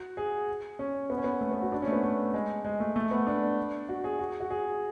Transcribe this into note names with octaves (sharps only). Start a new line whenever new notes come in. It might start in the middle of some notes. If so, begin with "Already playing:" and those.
Already playing: F#4
G#4
C#4
B3
C#4
B3
A3
B3
F#4
D4
C#4
A3
B3
A3
G#3
G#3
A3
A3
B3
D4
F#4
G#4
F#4
F#4
G#4